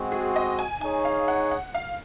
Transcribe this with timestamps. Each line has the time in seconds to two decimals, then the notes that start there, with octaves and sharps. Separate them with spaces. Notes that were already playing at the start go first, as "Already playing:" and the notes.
Already playing: G#3 C4 F#4
0.12 G#4
0.36 D#5
0.59 G#5
0.81 D#4 G#4 C#5 G#5
1.05 F5
1.28 F#5
1.51 F#5
1.75 F5